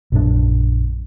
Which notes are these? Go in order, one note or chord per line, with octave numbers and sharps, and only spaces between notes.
A#1 F#2 C#3 D4